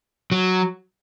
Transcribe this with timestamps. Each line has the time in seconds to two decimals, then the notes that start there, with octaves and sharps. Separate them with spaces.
0.32 F#3